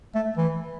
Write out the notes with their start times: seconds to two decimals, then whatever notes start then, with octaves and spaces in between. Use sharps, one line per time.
0.15 A3
0.37 E3